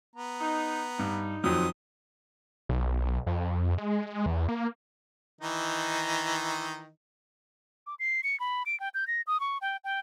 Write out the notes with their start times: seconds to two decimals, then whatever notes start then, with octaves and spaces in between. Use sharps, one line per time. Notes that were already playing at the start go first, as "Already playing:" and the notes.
0.16 B3 A#5
0.41 D#4
0.99 G2 D#4
1.44 F2 D#3 F#3 C5 D#6
2.69 B1
3.27 F2
3.78 G#3
4.26 E2
4.48 A#3
5.41 D#3 E3 D#4
7.87 D6
7.99 C7
8.23 C#7
8.40 B5
8.66 D7
8.80 G5
8.94 G6
9.07 A#6
9.27 D#6
9.40 C#6
9.61 G5
9.84 G5